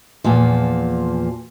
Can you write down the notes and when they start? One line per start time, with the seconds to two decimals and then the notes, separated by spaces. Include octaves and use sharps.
0.24 E2 A#2 F3